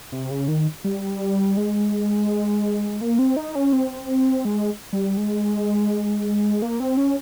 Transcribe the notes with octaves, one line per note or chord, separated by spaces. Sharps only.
C3
C#3
D#3
G3
G#3
A#3
C4
D#4
C#4
C4
G#3
G3
G#3
A#3
C4
C#4